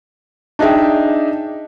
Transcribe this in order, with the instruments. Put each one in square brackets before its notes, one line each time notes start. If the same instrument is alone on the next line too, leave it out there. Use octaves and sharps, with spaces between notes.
[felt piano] D4 D#4 G#4 E5 G5